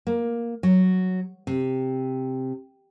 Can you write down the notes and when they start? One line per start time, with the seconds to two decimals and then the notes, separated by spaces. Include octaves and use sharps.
0.07 A#3
0.63 F#3
1.47 C3